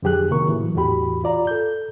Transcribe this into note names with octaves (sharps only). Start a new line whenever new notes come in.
F2 D3 F#3 G4 G#4 F#6
C3 D#3 F#3 A#3 A#4 C#6
A2 E3 F#3
E2 A2 E3 F#4 G4 B5
F4 D5 A#5
A4 G6